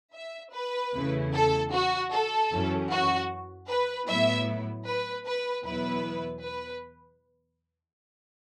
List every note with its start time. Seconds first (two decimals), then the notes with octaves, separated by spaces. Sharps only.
0.15 E5
0.54 B4
0.94 E2 C#3 A3 E4
1.33 A4
1.72 F#4
2.12 A4
2.50 F#2 E3 C#4
2.90 F#4
3.68 B4
4.07 A2 F#3 B3 E4 E5
4.86 B4
5.26 B4
5.65 E2 B2 F#3 B3 E4 B4
6.43 B4